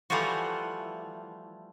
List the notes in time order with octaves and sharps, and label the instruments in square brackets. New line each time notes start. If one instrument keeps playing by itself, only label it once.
[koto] E3 F3 G3 A3 F4 F#4